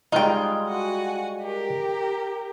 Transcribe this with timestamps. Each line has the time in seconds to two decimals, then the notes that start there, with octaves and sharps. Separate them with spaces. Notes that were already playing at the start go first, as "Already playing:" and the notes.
0.12 G3 G#3 D#4 F4 G5
0.65 F#4 F#5 G#5
1.41 G4 A#4